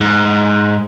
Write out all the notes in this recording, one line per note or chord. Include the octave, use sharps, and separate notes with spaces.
G#2